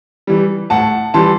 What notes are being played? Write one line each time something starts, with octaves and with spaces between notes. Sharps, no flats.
E3 G3
A2 F#5 A5
E3 G3 A5 C6